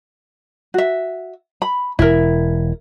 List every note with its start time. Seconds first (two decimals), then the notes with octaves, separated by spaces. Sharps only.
0.74 F#4 E5
1.62 B5
1.99 E1 E4 A#4